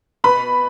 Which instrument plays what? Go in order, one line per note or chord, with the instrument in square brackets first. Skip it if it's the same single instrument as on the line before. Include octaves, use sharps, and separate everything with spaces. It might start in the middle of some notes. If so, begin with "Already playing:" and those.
[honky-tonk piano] B2 B4 B5